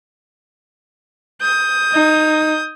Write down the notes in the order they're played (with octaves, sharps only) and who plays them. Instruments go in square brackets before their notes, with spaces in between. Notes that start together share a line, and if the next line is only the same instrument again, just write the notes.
[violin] D#6 G6
[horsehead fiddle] D#4